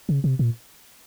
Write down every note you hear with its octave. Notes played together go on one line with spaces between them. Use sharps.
C#3
C3
A#2